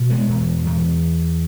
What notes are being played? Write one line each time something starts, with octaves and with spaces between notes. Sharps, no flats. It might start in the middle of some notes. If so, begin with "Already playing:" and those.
Already playing: B2
G#3 B3
E2
E2